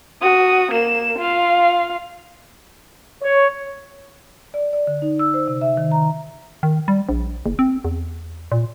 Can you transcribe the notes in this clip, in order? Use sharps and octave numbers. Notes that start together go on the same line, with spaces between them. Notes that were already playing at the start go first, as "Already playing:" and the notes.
F#4 D#6
A#3 E7
F4 F5
C#5
D5
D5
D3
D#4
E6
C5
C3
E5
D#3
A#5
D#3
G3
A#1
F#1
C4
E2
A#2